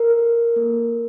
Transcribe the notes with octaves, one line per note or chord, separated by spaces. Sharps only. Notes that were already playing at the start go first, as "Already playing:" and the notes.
Already playing: A#4
A4
A#3